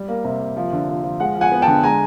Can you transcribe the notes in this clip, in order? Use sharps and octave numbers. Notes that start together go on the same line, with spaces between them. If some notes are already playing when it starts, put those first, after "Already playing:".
Already playing: G3
A#3
C3
A#3
F3
D3
F3
F3
G#3 F#5
F3
F#5 G#5
B3
G5 A5
D3
G#3 G#5 A#5